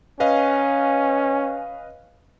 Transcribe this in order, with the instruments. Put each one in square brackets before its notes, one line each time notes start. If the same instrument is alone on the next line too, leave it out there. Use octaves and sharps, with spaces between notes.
[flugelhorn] C#4 [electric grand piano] B4 D#5 F5